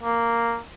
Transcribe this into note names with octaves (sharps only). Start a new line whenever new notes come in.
A#3